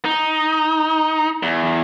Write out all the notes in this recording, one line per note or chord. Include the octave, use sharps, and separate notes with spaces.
D#4
E2